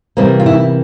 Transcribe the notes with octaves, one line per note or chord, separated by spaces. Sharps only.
C3 E3 G3 A#3 C4
F4
E4